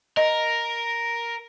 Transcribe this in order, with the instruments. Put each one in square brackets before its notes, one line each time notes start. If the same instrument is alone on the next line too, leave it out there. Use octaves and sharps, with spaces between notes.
[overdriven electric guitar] A#4 [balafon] D#5